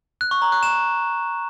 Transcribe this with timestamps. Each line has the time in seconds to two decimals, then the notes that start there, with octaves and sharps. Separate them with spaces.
0.21 F#6
0.31 C#6
0.42 A#5
0.52 F#6
0.63 E7